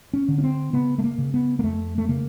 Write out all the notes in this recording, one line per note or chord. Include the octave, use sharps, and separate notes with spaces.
C#4
D3
C#4
C4
C#3 B3
A3
A#3
C#3
B3
A#3
F2 A3
A3
C#3 A#3